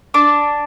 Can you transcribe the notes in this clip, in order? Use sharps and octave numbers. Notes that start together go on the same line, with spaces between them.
D4 D6